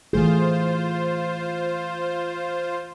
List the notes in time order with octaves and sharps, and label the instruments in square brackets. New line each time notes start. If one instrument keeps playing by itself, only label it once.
[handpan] E3 A3 G#4 [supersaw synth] F4 C5